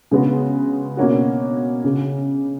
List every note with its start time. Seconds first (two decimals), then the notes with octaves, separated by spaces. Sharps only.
0.11 C#3 G#3 B3 F#4
0.97 B2 A#3 C#4 F#4
1.84 C#3